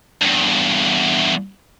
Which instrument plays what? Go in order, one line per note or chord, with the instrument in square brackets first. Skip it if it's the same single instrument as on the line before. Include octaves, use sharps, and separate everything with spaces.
[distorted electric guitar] E2 G2